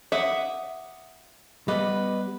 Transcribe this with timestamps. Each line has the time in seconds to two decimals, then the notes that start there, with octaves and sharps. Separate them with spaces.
0.12 E5 F#5 D6 D#6
1.68 G3 B3 B4 D#5 D6